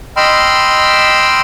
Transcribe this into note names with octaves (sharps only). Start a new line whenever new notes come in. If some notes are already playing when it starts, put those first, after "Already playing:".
D#5 G5 B5 C6 E6 F6